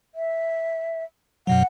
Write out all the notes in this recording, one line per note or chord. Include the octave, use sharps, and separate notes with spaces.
E5
F#2 B2 F#3 F#5